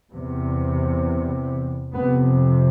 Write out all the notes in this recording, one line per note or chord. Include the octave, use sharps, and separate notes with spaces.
E2 C3
F2 C3 B3